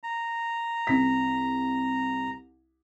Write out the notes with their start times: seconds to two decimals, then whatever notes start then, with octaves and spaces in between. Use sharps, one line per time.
0.03 A#5
0.87 C2 B6